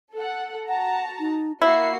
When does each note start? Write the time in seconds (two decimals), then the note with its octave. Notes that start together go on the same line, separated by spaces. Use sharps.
0.14 A4 F#5
0.68 F#4 F#5 A5 A#5
1.19 D#4
1.62 A#3 E4 F#4 E5 C7